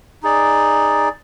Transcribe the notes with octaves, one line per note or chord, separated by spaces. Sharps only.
D#4 G#4 D5